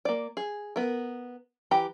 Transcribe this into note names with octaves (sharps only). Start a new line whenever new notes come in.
A#3 D5
G#4
B3 A#4
E3 G4 A#5